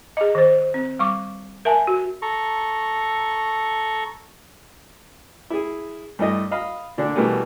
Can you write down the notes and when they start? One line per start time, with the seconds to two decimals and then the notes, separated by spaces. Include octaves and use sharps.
0.17 G#4 D#5
0.35 D#3 C5
0.74 C4
0.99 G3 C#6 D6
1.65 A#4 E5 G#5 A5
1.87 F#4
2.22 A4 A#5 C#6
5.50 E4 G#4
6.19 G2 A3 E4 D#5
6.51 D#5 F5 B5 F6
6.98 A#2 D3 D4
7.16 B2 E3 G3 A3 A#3